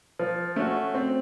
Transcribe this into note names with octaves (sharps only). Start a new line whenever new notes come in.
F3
A3 C#4 F#4
C4